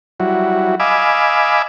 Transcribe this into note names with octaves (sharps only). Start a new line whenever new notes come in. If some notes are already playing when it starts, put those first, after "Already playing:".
F#3 G3 E4 F#4
D#5 F5 G#5 B5 D6 E6